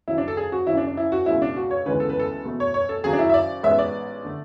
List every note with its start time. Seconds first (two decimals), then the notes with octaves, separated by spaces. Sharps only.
0.08 G#1 F#2 C#3 F#3 E4
0.18 D4
0.28 A4
0.37 G#4
0.52 F#4
0.67 G#1 F#2 C#3 E4
0.77 D4
0.87 D4
0.97 E4
1.12 F#4
1.26 C#2 B2 G#3 E4
1.42 D4
1.56 F#4
1.71 C#5
1.86 D2 C#3 E3 G#3 B3 B4
2.00 A4
2.10 B4
2.19 A4
2.45 E2 B2 A3
2.60 C#5
2.74 C#5
2.89 A4
3.04 G#1 F#2 C#3 F#3 G#4
3.13 D4
3.19 E4
3.30 E5
3.34 D5
3.63 A1 G#2 G#3 B3 E5
3.79 D5
4.25 D3 A3